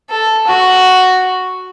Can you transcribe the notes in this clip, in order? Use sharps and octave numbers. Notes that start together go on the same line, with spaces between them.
A4
F#4